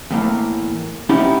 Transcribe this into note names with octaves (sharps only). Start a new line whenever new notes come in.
E2 A2 A#3
B3 C#4 D#4 E4 G4